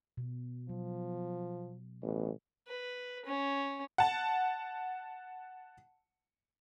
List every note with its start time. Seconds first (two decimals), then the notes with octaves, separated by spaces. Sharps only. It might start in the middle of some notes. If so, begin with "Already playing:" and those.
0.17 B2
0.69 F3 F#3
2.03 A1 B2
2.67 B4
3.25 C#4
3.98 F#5 A5